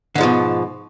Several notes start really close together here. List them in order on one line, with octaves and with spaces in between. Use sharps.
D3 G#2 F3 B2